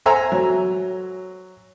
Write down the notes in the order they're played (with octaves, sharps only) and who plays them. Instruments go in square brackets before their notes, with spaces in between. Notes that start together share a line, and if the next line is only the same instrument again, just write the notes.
[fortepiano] A4 C5 E5 G#5 A#5 E6
F#3